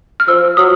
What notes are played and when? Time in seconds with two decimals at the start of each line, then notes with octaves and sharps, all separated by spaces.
0.20 F6
0.28 F3 E6
0.57 F#3 D#6